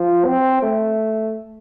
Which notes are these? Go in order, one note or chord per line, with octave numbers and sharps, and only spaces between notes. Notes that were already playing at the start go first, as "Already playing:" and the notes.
Already playing: F3
C4
A3